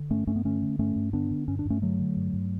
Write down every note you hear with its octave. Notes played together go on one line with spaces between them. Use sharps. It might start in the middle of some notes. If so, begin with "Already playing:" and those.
Already playing: D3
G2 A3 C#4
G2 A3 C#4
B3
D3 A3 C#4
D3
G2 A3 C#4
G2
D3 B3 D4
D3
G2 C#4
D4
G2 A3 C#4
D3 F#3 A3
D3
G2
G2